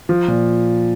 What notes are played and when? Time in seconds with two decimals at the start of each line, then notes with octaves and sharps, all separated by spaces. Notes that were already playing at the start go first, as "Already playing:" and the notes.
0.09 F3
0.28 A#2